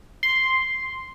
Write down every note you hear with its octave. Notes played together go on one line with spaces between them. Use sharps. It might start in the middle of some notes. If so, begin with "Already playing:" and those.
C6